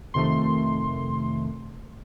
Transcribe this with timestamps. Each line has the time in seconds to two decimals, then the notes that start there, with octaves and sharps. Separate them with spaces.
0.14 F2 C3 D#3 A3 C6